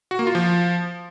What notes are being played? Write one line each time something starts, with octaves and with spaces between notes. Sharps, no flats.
F#4
A#3
F4
F3